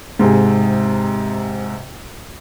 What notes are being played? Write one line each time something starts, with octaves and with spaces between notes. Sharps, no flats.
G#2 C3 G#4